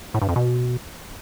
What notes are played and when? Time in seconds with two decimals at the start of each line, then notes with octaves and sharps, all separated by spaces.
0.14 A2
0.22 G2
0.29 F2
0.36 B2